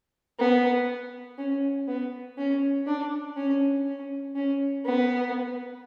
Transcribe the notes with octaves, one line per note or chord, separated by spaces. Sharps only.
B3
C#4
B3
C#4
D4
C#4
C#4
C#4
B3